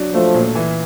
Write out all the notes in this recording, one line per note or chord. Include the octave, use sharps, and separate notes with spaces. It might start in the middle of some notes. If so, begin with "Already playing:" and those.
Already playing: F#3 D4
F3 A3
A#2
E3